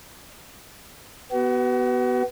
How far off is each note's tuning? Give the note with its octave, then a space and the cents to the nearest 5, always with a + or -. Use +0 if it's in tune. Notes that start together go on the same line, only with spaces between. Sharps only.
B3 +0 F#4 +35